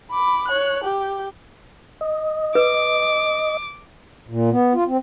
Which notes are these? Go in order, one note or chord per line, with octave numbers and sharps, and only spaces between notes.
B5 D6
C#5 F#6
G4
D#5
B4 D6
A#2
B3
F4
C4